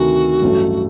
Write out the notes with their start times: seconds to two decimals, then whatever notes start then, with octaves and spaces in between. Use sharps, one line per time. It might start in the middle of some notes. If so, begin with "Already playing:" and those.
Already playing: D2 C3 D#3 A3 F#4
0.42 A1 G2 F#3 A3